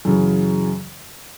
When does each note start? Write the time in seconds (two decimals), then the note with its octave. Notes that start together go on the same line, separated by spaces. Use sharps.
0.05 F#2 C#3 E3